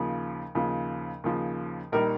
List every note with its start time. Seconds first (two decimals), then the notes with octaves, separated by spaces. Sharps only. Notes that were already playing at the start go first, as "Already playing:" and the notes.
Already playing: D#2 C#3 F3
0.55 D#2 C#3 F3
1.24 D#2 C#3 F3
1.92 A#1 D#3 G3 A#4